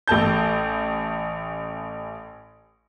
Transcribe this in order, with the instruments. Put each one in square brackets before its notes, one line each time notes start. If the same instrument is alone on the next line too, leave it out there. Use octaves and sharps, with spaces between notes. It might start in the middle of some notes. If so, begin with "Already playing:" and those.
[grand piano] A1 A3 A5 G6